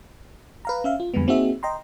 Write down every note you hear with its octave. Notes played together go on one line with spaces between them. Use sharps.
B4 F5 A#5
C#4 E5 F5
F4
F2 D3 G3 G#3 B3
A#3 C4 D#4 F#4 G#4 E5
D#5 G5 A#5 C6